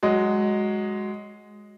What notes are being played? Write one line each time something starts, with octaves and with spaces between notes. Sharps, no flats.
F#3 G#3 D#5